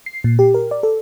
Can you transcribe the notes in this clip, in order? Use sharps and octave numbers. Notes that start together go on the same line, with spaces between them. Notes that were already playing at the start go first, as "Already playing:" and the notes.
C7
A#2
G4
A#4
D5
A4